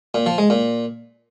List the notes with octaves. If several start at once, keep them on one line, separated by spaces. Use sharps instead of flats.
A#2
F3
G#3
A#2